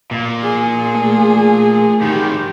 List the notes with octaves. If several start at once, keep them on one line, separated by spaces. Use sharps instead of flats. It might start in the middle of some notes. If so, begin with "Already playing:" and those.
A#2
G#4
A3
G#2 D#3 G4